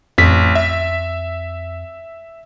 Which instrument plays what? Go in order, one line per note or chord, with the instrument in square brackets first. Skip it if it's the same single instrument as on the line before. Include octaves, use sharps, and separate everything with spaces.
[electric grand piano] A1 B6 [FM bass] F2
[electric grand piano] E5